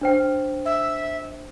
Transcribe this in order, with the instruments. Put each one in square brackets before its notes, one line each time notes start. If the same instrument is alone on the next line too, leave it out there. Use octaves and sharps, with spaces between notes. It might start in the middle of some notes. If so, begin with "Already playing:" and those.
[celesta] D4 C5 G5
[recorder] E5